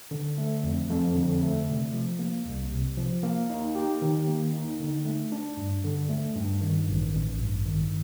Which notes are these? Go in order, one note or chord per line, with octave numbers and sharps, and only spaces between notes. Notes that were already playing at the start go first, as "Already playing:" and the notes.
D3
A3
F2
F2
D3
A3
C3
F3
A#3
C2
C3
F3
A#3
D#4
G4
D#3
A#3
D#4
D3
A3
D4
G2
D3
A3
G2
D#3
A1
A1
G2
D#3